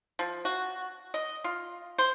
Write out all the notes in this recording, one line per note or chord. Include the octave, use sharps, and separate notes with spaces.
F3
F#4
D#5
F4
C5